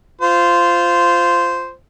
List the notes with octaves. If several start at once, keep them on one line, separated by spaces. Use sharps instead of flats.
F4 C5